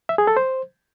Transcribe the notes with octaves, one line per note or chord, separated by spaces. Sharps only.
E5
G#4
A4
C5